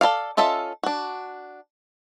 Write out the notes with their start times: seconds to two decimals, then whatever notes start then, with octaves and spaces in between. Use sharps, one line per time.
0.01 A4 A#4 D5 F5
0.37 C#4 F4 A4 D#5 E5
0.83 D4 F#4